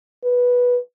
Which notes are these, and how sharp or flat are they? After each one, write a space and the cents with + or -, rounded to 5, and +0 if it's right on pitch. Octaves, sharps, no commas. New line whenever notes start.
B4 -10